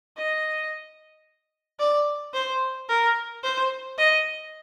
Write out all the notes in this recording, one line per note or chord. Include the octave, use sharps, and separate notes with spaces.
D#5
D5
C5
A#4
C5
D#5